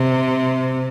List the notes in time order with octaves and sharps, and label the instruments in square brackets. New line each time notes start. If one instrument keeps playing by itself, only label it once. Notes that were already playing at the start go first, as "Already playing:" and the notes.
Already playing: [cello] C3